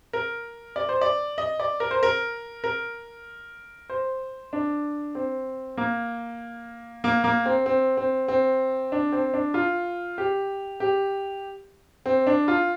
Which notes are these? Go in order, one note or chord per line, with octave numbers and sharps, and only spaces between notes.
A#4
D5
C5
D5
D#5
D5
A#4
C5
A#4
A#4
C5
D4
C4
A#3
A#3
A#3
C4
C4
C4
C4
D4
C4
D4
F4
G4
G4
C4
D4
F4